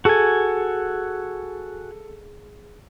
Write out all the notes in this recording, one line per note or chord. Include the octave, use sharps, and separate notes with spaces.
F#4 G#4 A4 G#5